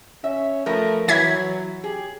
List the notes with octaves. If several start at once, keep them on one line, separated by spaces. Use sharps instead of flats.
C#4 E5
F3 A3 A#4 B4
E3 F#3 E4 G#6 B6
G4 G#4